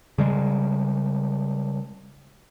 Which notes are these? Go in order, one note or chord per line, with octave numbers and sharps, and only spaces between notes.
C#3 G3 G#3